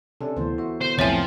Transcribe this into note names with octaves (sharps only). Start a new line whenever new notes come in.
C3 C#4 D4 A4
D2 E3 B3 C5
F#4 E5
D3 B3 C5
C2 F2 A2 F3 C4 C#5 E5 G#5